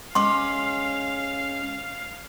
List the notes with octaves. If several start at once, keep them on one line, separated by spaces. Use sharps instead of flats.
G#3 C#4 F5 C6 D6